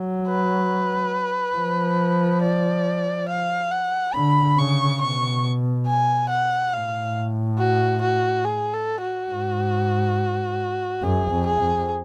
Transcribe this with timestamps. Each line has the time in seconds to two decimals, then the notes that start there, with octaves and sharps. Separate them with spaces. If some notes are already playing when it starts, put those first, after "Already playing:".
Already playing: F#3
0.28 B4
1.57 F3
2.42 D5
3.29 F5
3.72 F#5
4.14 D3 B5
4.57 C#3 C#6
5.01 B2 C#6
5.87 G#5
6.29 F#5
6.73 A2 F5
7.58 F#4
8.02 F#4
8.45 G#4
8.73 A4
9.02 F#4
9.31 G#2
11.02 F#2 G#4
11.31 F2
11.46 G#4
11.61 F2